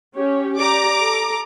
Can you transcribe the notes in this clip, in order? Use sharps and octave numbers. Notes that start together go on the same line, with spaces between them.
C#4 G4 C#5
G4 D5 A#5 D6
A4